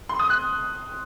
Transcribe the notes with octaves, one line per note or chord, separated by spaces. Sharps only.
C6
D#6
F#6